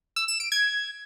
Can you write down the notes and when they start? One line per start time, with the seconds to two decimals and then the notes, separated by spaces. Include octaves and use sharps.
0.16 E6
0.28 E7
0.40 D7
0.52 G#6